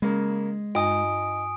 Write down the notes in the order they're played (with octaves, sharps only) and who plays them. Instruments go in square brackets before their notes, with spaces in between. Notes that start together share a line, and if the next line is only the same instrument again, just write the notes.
[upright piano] C#3 A#3 [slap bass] G#3
[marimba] G2 [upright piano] D#4 [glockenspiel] G#5 D#6 D7